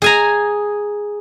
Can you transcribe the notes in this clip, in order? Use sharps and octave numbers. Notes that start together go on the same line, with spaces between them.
G#4 G#5 A#5